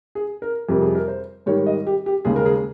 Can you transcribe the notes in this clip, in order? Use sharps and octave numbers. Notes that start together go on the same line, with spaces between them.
G#4
A#4
F2 C3 G3 A#4
G#4
A#4
C5
G#2 D#3 G3 C#5
D#5
G4
G4
D#2 C#3 G#3 G#4
A#4
G#4